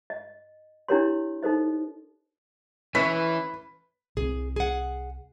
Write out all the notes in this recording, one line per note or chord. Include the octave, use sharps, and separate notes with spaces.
D#5
D4 E4 G4 A#4 C#5 C6
D#4 A4 A#4 C5 D#5
E3 C#4 E4 B4 B6
C2 C3 G#4
G#4 F#5